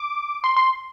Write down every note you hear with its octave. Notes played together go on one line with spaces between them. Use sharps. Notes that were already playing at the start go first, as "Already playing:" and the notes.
Already playing: D6
C6
C6